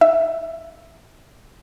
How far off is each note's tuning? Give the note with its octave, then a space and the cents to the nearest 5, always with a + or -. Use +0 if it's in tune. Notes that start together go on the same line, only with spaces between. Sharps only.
D#4 +0 E5 +0